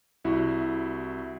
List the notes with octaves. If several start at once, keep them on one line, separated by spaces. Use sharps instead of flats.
C2 E4 F#4